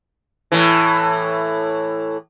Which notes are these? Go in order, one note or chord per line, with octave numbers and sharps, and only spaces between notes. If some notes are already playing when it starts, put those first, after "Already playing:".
A2 E3